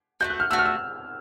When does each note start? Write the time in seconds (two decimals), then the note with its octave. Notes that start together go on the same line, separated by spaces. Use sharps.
0.20 A3 D4 F#4 G6
0.30 F#6
0.40 F6
0.51 A3 D4 F#4 E6
0.59 F6
0.66 E6